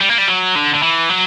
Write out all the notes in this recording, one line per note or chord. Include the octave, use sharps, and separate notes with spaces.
G3
A#3
G3
F#3
D3
D3
E3
F#3